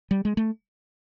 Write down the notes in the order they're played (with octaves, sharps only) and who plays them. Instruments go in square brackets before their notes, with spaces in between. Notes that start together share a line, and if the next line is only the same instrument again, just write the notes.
[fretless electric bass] G3
G#3
A3